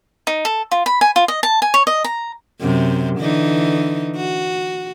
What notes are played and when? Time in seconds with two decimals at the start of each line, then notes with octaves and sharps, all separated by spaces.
0.27 D#4
0.45 A4
0.71 F4
0.86 B5
1.01 G#5
1.16 F4
1.28 D#5
1.43 A5
1.62 G#5
1.74 C#5
1.87 D#5
2.04 A#5
2.61 F#2 C3
3.18 D3 E3 D#4
4.16 F#4